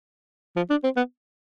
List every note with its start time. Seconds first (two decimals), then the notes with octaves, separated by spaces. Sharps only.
0.56 F3
0.70 D4
0.84 C4
0.96 B3